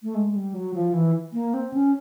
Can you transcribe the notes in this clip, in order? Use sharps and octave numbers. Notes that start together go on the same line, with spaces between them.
A3
G#3
G3
F#3
F3
E3
A#3
C4
C#4